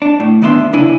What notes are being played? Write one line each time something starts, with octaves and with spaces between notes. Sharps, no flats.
D4
A2
D2 D#3 B3 D4 E5 C6
C2 C#3 D4 E4 G#5